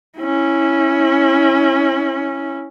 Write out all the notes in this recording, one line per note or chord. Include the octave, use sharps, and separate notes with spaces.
C#4 E4